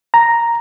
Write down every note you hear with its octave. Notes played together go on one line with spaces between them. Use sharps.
A#5